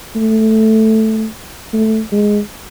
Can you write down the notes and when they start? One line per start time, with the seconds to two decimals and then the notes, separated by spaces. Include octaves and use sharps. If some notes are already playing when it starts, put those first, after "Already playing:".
0.16 A3
1.73 A3
2.12 G#3